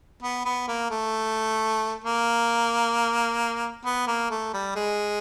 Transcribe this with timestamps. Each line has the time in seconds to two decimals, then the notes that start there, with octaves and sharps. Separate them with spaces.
0.23 B3
0.45 B3
0.68 A#3
0.91 A3
2.04 A#3
3.85 B3
4.07 A#3
4.30 A3
4.54 G3
4.76 G#3